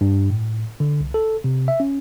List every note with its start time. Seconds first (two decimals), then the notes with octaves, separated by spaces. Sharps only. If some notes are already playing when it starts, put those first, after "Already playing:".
0.01 G2
0.30 A2
0.80 D3
1.01 C2
1.14 A4
1.44 C3
1.68 E5
1.80 C#4